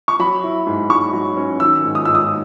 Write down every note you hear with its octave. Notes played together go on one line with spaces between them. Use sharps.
C#6
F#3 B5
E4
G#2
G#2 C#6
F#3
C#4
D#3 E6
G#2
D#6
G#2 E6
D#6